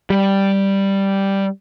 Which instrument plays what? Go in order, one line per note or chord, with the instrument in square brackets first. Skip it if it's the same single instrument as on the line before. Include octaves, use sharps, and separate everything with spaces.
[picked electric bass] G3